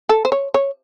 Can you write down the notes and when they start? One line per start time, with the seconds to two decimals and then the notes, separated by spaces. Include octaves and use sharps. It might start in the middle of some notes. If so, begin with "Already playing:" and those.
0.09 A4
0.25 C5
0.32 C#5
0.54 C#5